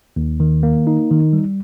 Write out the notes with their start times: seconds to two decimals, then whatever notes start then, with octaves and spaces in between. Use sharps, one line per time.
0.16 D#2
0.40 D#3
0.63 A#3
0.87 D#4
1.11 D#3
1.33 G3